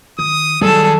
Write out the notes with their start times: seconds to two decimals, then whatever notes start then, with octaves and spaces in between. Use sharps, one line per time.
0.19 D#3 D#6
0.61 D#3 F#3 G3 G#4 A4 A5